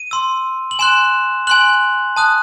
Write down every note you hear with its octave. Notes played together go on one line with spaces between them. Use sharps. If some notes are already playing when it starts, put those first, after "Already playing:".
Already playing: D#7
C6 E6
F#7
G#5 C6 F#6 E7
G#5 C6 F#6 F#7
A5 D#6 F#6